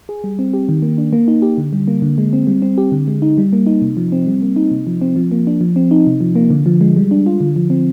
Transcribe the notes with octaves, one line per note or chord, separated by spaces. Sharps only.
G#4
G3
C4
G4
D#3
A#3
D4
A#3
D#4
G4
D3
G3
A#3
D3
G#3
C4
G3
C4
G4
D3
G#3
D#4
G3
A#3
D#4
C3
F3
C4
G3
A#3
D#4
C3
F3
C4
F3
A#3
D4
F3
C4
D#4
C3
F3
A#3
D3
F3
G#3
G3
D4
F4
D3
F3
C4